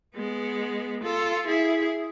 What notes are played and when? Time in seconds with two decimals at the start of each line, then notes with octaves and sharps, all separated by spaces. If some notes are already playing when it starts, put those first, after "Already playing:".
0.15 G#3 B3
1.02 F4 A4
1.45 E4 G#4